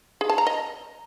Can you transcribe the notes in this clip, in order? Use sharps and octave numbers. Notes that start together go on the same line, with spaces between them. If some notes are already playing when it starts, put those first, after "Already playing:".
G#4
A5
A#5
D#5